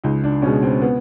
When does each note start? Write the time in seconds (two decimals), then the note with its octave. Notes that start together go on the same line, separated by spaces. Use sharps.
0.04 C#2 D#4
0.24 D4
0.42 B2 G#3 C#4
0.63 C4
0.82 B3